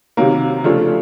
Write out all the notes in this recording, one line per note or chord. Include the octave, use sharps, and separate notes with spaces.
C3 D#3 F#3 A#3
C#3 F3 A3 D4 F4